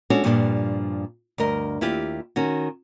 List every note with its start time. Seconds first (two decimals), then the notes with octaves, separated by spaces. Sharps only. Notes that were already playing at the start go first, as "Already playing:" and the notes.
0.10 G#3 C#4 D4 F#4 A4 C#5
0.24 G2 A#2 F3 G3 C#4 D4
1.38 D2 G2 A#4 D#5
1.81 D#2 E4 F4 G4
2.36 D#3 C#4 F#4